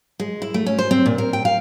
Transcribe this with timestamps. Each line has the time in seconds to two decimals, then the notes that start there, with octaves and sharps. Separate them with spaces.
0.20 G#3
0.42 E4
0.54 A3
0.66 C#4
0.79 C5
0.91 C4
1.06 A#2
1.18 A#4
1.33 G5
1.45 F5